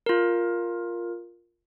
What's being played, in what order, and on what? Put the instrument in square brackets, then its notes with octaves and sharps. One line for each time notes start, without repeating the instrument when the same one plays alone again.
[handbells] F4 A#4